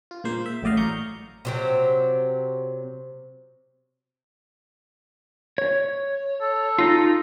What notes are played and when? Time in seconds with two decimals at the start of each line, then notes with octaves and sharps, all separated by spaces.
0.11 F4
0.24 A#2 G#3 A#3 C5
0.46 E5
0.62 A1 A2 F#3 D5 D#5 F5
0.77 A#5 C#6 G6
1.45 C3 F#3 C4
5.58 C#5
6.41 A4
6.79 D#4 F4